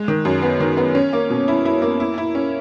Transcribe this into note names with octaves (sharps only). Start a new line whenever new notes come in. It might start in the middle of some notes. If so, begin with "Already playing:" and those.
Already playing: G#3
D#3
F#2
B3
D#3
B3
C#4
A#3
B2
E4
E4
A#3
E4
E4
C#4